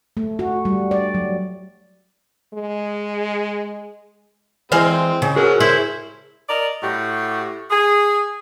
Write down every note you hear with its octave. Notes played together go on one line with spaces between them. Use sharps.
A3
F#4
G3
D5
F#3
G#3
E3 G#3 C4 C5 F5
C#3
C#4 F#4 G#4 A#4
E4 C5 C#5
A#4 D5 D#5
A2 F#4 G4
G#4